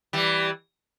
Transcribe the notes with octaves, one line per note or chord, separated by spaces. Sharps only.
E3 G3